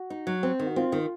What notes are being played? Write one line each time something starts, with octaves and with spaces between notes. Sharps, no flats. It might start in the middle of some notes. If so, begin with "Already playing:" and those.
Already playing: F#4
D#4
F#3
C4
D#3
F#4
C4 F4
D#3